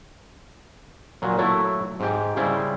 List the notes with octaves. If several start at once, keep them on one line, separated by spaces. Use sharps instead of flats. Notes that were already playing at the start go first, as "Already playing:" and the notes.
A#2 F#3
F#3 A3 E4
G#2 G4
C#3 G3 E4 C5